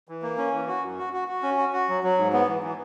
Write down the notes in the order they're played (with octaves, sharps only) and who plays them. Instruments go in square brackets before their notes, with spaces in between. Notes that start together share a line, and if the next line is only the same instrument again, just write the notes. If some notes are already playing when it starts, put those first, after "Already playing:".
[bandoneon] E3
A#3
C#4
E3
F#4
F#2
F#4
F#4
F#4
C#4
F#4
F#4
F#3
F#3
G#2
B3
E3
E3